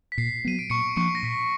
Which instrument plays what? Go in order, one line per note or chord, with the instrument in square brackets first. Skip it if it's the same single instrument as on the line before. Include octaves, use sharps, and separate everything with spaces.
[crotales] B6
[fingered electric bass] A#2 [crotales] C7
[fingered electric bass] F#3 B3 [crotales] D#7
[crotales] D7
[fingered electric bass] A#2 [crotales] C#6 C#7
[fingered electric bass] F3 A#3 D4 [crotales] C#6 C#7
[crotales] A#6
[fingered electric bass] A#2 [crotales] B6